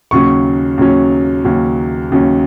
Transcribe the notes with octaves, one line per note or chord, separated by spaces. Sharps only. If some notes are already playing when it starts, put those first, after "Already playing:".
D#2 C#3 F#3 C#4 C#6
D#2 C#3 F#3 C#4
D#2 C#3 F#3 C#4
D#2 C#3 F#3 C#4